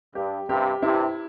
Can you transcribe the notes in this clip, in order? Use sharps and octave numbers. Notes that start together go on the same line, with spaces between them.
G2 G4
G2 C3 G4
G2 C3 E4